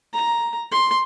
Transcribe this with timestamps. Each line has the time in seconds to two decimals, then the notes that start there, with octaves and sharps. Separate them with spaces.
0.13 A#5
0.72 C6